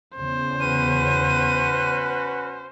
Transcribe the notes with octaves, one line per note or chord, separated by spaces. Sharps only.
E2 C#3 C5
C#4 F#4 B4 D#7